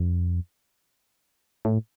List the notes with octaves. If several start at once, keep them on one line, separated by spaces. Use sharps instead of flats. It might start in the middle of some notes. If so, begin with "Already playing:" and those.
Already playing: F2
A2